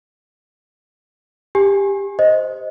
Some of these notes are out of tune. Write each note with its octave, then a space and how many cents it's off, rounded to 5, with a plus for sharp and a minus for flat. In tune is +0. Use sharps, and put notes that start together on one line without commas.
G4 +15 G#5 +0
C5 +0 D#5 +5